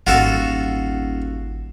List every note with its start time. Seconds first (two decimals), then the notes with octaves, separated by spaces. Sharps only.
0.07 D#1 G#1 F4 F#4 A4 F#5